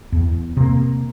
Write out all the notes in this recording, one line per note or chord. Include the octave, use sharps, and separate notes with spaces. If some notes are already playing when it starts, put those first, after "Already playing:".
E2
C3 A#3